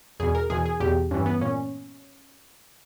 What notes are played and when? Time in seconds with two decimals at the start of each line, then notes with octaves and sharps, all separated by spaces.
0.20 E2 B2 G#4
0.35 A#4
0.50 E2 B2 G#4
0.65 G#4
0.80 E2 B2 G4
1.11 G2 E3 C#4
1.26 B3
1.41 A#2 C#4